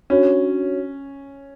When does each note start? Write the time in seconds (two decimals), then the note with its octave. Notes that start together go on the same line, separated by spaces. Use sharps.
0.10 C#4 D4 F#4 C#5